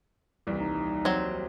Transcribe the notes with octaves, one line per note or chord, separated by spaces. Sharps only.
D#1 C2 E3
D#4
F#3 C4